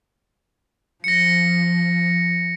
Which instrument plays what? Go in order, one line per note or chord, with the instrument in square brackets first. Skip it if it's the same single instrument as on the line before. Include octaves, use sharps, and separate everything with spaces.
[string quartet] F3 [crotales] A#6 C#7